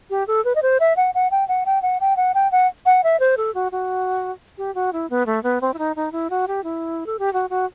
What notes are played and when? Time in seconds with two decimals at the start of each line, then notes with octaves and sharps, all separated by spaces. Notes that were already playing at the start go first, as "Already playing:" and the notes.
0.10 G4
0.28 A4
0.45 B4
0.55 D#5
0.62 C5
0.80 E5
0.97 F#5
1.15 F#5
1.31 G5
1.48 F#5
1.66 G5
1.82 F#5
2.01 G5
2.17 F#5
2.34 G5
2.52 F#5
2.86 F#5
3.04 E5
3.20 C5
3.37 A4
3.55 F#4
3.72 F#4
4.58 G4
4.75 F#4
4.93 E4
5.10 B3
5.26 A3
5.43 B3
5.61 C4
5.74 E4
5.78 D#4
5.96 D#4
6.12 E4
6.30 F#4
6.48 G4
6.64 E4
7.06 A4
7.19 G4
7.33 F#4
7.50 F#4